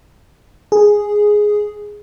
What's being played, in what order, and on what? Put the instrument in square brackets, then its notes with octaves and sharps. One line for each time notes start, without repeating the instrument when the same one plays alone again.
[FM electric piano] G#4